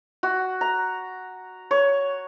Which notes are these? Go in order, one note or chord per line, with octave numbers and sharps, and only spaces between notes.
F#4
A#5
C#5